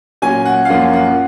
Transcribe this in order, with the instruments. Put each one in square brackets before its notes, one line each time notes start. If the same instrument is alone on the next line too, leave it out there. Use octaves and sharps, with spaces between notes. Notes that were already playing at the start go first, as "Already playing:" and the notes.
[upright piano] A#2 F#3 C#4 [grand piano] G#5
[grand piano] F#5
F5
[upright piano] F#2 F3 A#3 C#4 F4 [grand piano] F#5
[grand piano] F#5